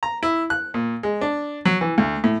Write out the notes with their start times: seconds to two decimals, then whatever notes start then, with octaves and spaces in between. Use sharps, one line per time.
0.03 A#5
0.23 E4
0.50 F#6
0.74 A#2
1.03 G#3
1.21 D4
1.65 F#3
1.81 E3
1.98 D2
2.24 A2